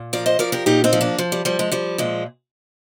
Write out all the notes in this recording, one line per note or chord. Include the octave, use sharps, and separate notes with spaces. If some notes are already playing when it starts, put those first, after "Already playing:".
Already playing: A#2
F3 A#4 D5
C5 D#5
F3 A#4 D5
G4 A#4
A#2 D#4 G4
C4 D#4
F3
A#3 D4
F3
G3
F3 G3
G#3
F3 G3
A#2 G#3